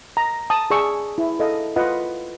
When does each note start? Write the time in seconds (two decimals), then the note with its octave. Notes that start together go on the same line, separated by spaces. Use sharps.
0.17 A#5
0.50 A5 D#6
0.70 G#4 D5 A5 C#6 E6
1.18 E4
1.39 A4 D#5 F5
1.76 F4 B4 D#5 F#5